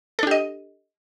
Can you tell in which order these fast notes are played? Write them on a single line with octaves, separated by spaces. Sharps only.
A4 D4 G4 D#5